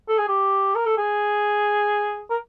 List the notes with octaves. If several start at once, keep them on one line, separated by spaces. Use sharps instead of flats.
A4
G#4
G4
A#4
A4
G#4
A#4